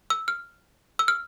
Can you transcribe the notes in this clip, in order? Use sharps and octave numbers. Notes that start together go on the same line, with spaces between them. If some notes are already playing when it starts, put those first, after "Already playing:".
E6
F6
E6
F6